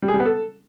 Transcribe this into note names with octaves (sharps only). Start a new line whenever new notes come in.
G3
G#4
G3
B3
A4